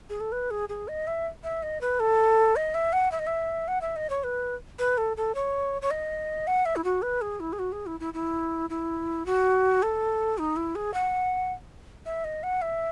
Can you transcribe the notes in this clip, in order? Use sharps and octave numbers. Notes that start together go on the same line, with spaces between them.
G#4
A4
B4
G#4
G#4
D#5
E5
E5
D#5
B4
A4
D#5
E5
F#5
E5
D#5
E5
F#5
E5
D#5
C#5
B4
B4
A4
A4
C#5
C#5
D#5
F#5
E5
E4
F#4
B4
G#4
E4
G#4
F#4
G#4
E4
E4
E4
E4
F#4
A4
D#4
E4
G#4
F#5
E5
D#5
F#5
E5